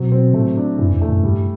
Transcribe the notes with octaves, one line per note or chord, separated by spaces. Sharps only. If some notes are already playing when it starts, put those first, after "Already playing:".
Already playing: B2 F#3 C4
C4
A2 A3
D4
F#2 E3
E2
A3
F#2
G2 G3